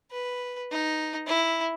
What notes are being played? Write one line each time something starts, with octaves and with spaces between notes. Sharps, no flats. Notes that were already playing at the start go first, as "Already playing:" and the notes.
B4
D#4
E4